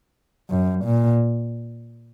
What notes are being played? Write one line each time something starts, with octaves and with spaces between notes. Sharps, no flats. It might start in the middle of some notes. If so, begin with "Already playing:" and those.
F#2
A#2